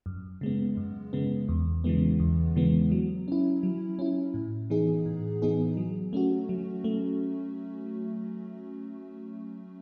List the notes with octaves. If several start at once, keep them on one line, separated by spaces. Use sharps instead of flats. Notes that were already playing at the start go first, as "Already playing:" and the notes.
F#2
C#3 G#3 B3
F#2
C#3 G#3 B3
E2
C#3 E3 G#3 B3
E2
C#3 E3 G#3 B3
F#3
C#4 E4
F#3
C#4 E4
A2
E3 B3 D#4 G#4
A2
E3 B3 D#4 G#4
F#3
A3 C#4 F#4
F#3
A3